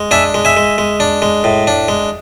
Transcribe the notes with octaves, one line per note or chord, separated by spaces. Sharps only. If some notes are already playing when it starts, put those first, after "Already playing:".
Already playing: G#3
D4 E5 G#5
G#3
E5 G#5
G#3
G#3
D4
G#3
A2
D4
G#3